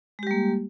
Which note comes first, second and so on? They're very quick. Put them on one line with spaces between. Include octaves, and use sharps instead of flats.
G#3 G4 G3 A#3